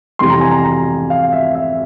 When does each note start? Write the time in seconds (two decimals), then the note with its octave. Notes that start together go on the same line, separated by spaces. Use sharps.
0.19 F2 C3 E3 G3 C6
0.30 A#5
0.41 G#5
0.51 A#5
1.10 F5
1.33 E5
1.55 E5